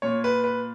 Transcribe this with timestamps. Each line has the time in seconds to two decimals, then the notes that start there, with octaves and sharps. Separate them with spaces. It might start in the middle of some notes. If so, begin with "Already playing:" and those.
0.02 A#2 C#5
0.24 B4
0.44 B4